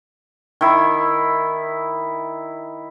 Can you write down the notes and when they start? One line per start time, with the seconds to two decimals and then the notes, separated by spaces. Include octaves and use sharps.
0.61 D#3 E4